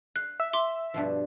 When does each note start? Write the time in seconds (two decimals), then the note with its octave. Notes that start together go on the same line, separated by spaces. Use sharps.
0.16 F5 F#6
0.40 E5
0.53 C6 D6 G7
0.94 G2 B2 F3